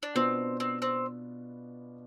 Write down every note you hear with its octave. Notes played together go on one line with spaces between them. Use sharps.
D4
B2 B3 C4 D4 F4
C4
C4